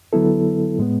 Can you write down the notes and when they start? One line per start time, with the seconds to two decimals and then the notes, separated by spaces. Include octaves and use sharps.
0.13 D3 F#3 B3 E4 A4
0.79 A2 G#3 B3